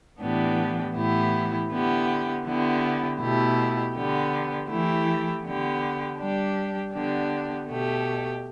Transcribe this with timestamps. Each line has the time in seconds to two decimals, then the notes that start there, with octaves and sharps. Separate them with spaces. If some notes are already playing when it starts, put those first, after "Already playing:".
0.20 A2 E3 B3 D4 G4
0.95 A2 E3 B3 E4 G4
1.70 D3 B3 E4 G4
2.45 D3 B3 E4 G4
3.20 B2 A3 E4 G4
3.95 D3 B3 G4
4.69 E3 A3 E4 G4
5.44 D3 B3 G4
6.18 G3 D4 G4
6.93 D3 B3 D4 G4
7.68 B2 A3 G4